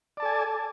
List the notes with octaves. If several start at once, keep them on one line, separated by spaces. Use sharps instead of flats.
A4 D5 G#5 A5